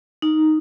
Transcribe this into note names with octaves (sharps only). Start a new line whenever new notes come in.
D#4